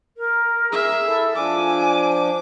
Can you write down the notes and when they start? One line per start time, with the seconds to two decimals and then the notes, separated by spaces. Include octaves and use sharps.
0.17 A#4
0.72 G#4 E5
1.05 E4 A4
1.35 F3 D4 G#5 D6